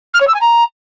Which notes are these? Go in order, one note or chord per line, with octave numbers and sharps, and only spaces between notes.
F6
C#5
E6
G#5
A#5